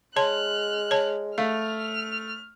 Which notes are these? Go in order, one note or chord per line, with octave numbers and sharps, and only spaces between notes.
G#3 C#5 A5 C6 F6 F#6
C#5 A5
A3 F5 F6 F7